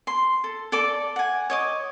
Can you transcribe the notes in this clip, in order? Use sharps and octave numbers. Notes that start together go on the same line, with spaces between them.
C6
A4
A4 D5 D6
F#5 G#5
C#5 D#5 D6